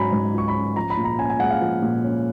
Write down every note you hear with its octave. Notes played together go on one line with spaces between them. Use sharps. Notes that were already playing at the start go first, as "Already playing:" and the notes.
Already playing: G#2 F#3 C#4 G#5 A#5 B5
G#2
F4 C#6
B5
C#4
F3 A#5
B5
A#2
A#5
C#4 G#5
G#5
G#3 F#5
F5
F3
A#2
C#4